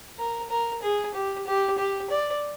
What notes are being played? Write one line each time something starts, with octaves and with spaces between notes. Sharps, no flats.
A#4
A#4
G#4
G4
G4
G4
D5